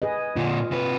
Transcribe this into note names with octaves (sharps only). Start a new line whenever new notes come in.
G#4 B4 D#5
A#2 D3 F4
C3 B4